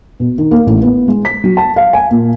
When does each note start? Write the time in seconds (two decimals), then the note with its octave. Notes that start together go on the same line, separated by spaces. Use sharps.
0.20 B2
0.38 D#3
0.51 A#3
0.67 A1
0.82 B3
1.08 G#3
1.25 B6
1.44 F#3
1.57 A5
1.76 F5
1.93 G#5
2.11 A#2